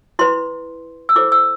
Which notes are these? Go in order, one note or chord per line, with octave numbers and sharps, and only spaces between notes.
E4 B4 C6
E6
E4 A4 C5 D6
E6